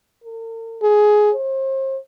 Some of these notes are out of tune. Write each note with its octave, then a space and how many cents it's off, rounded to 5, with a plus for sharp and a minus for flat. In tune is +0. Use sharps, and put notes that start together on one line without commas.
A#4 -45
G#4 +15
C5 +40